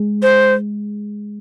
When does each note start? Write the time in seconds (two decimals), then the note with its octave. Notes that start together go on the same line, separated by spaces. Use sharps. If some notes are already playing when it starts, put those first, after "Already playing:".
Already playing: G#3
0.22 C5